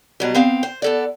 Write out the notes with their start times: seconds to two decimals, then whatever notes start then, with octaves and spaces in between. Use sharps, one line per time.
0.20 B2 F#3 G3
0.35 B3 C4 F5 G5
0.63 C5
0.82 B3 A4 D5